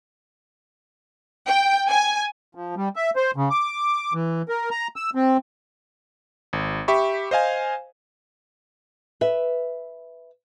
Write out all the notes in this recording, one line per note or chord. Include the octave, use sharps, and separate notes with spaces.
G5
G#5
F3
G3
E5
C5
C#3
D6
E3
A#4
A#5
E6
C4
G#1
G4 E5 B5 C#6
C5 D#5 F5 G#5
B4 E5